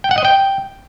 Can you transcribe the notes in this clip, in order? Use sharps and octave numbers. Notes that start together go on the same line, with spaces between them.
G5
F#5
D#5
G5